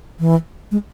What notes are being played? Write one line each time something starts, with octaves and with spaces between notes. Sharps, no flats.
E3
G#3